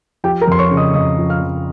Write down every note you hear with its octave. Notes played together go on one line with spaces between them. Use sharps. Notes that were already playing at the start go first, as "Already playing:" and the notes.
F3 G4 G5
A#4 A#5
F2 C6
C#5 C#6
C#3
D#5 D#6
F2 D#5 D#6
F3
F5 F6
F2